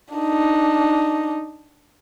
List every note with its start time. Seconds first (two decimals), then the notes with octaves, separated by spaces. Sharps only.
0.14 D4 D#4